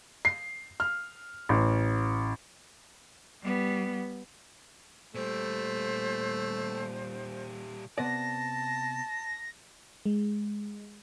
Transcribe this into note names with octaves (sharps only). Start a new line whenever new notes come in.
C7
F6
A1
G3 B3
A#2 G3 A3 C5
C3 B3 D5 A5 A#6
G#3